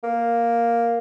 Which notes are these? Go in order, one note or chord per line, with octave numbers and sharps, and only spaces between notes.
A#3